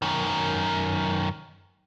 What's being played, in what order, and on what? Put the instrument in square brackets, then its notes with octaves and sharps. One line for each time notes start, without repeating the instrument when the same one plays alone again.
[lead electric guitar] F#2 D#3